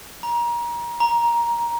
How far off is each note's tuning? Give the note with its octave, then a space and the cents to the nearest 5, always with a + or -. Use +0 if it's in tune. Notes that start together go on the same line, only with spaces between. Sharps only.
A#5 +30
A#5 +15